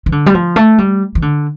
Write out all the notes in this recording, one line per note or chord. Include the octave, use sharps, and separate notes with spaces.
E3
D3
G3
F3
A3
G3
E3
D3